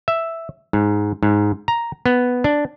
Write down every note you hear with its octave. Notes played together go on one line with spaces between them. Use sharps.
E5
G#2
G#2
A#5
B3
D4